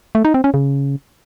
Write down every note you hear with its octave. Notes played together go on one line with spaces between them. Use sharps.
A3
D#4
C4
C#4
C#3